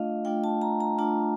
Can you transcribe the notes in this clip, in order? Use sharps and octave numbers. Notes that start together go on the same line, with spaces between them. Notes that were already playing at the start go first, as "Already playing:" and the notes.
Already playing: A3 D4 F4 D#5 F5
A3 D4 F4 G5
A5
A#5
A#5
A3 D4 F4 A5